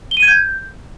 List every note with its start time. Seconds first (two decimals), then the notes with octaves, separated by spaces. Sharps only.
0.11 G7
0.17 D#7
0.22 G#6
0.28 G6